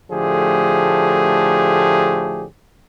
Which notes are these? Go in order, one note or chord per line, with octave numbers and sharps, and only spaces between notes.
A2 D3 F3 A3 G4 G#4